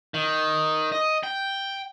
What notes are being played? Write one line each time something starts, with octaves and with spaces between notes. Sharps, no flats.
D#3
D#5
G5